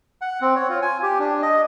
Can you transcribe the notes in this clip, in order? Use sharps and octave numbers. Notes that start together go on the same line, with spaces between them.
F#5
C4
C#5
F4
G#5
G4
D4
D#5